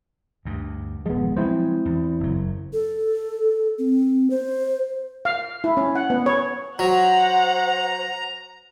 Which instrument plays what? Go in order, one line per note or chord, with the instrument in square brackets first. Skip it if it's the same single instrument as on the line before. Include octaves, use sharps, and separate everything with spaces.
[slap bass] D2 G2
[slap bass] D#1 F3 [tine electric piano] G#3 B3
[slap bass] F3 F#3 G#3 [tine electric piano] C4 E4 C5
[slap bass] E2
F#1 F#3
[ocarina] A4
C4
C5
[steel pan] F5
E4
C#4
F#5
B3
C#5
[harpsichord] F#3 [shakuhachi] C5 [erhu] F#5 [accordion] A#5